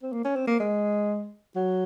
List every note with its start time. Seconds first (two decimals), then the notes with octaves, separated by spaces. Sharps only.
0.02 C4
0.12 A#3
0.24 C#4
0.36 C4
0.47 A#3
0.59 G#3
1.55 F#3